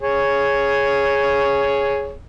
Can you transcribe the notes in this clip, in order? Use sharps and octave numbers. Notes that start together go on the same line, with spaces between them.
G#4 C#5